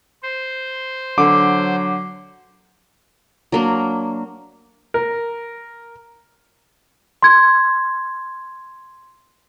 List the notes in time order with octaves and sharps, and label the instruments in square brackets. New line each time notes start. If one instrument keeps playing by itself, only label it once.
[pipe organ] C5
[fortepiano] D3 [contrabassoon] F#3 [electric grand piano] D6
[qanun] F#3 A#3 D4
[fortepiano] A#4
[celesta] C6 G#6